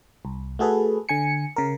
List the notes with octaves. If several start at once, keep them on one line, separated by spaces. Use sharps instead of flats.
C2
A3 F#4 G#4 A4 B4
D3 G#5 C#7
C#3 A#4